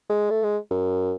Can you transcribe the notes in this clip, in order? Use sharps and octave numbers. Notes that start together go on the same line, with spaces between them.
G#3
A3
G#3
F#2